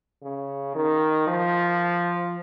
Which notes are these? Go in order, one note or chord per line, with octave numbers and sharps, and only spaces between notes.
C#3
D#3
F3